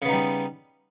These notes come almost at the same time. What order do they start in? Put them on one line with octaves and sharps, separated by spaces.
C#3 B3 D#4 G3